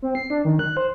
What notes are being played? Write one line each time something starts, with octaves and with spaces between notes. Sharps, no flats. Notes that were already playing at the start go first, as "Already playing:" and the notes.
C4
C7
D4
D#3
F#6
C5